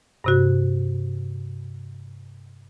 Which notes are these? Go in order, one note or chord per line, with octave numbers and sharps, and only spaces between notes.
G2 C3 F#4